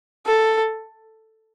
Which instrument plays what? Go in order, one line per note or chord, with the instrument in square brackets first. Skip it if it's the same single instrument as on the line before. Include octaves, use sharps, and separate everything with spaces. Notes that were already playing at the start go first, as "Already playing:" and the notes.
[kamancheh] A4